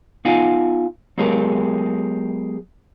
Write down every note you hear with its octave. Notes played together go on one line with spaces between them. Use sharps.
B3 D#4 F4 F5 F#5 G#5
F#3 G#3 B3 G4 G#4 A#4